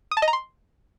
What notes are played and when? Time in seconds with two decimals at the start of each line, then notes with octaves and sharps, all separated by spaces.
0.11 D#6
0.17 A5
0.22 D#5
0.28 A#5
0.33 C6